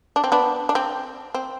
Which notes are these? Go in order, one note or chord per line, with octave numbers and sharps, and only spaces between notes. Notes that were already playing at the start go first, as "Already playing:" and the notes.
D4
C4
B3 D4
D4
C4
C4